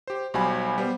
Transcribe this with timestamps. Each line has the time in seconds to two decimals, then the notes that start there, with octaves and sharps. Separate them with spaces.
0.07 G4 C5
0.34 B1 G3 F#4 C5 G#5 B5
0.78 G3 B3 C5